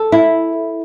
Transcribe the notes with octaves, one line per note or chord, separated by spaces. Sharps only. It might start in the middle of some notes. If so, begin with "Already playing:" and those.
Already playing: A4
E4